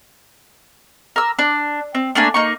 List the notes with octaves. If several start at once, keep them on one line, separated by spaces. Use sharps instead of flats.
A#4 E6
D4
C4
A3 A#3 D4 G#5
A#3 D#4 C#6